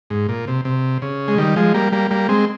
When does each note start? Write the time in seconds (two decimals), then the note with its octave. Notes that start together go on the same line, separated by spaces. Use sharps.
0.10 G#2
0.29 A#2
0.48 C3
0.65 C3
1.02 C#3
1.28 G#3
1.38 D#3 G3
1.56 F3 G#3
1.74 G3 A#3
1.92 G3 A#3
2.11 G3 A#3
2.29 G#3 C4